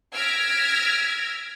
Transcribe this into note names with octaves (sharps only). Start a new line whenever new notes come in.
E6 F6 G#6 A#6 B6 D7